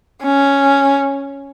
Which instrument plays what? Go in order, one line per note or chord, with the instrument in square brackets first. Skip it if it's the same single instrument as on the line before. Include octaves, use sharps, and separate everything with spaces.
[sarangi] C#4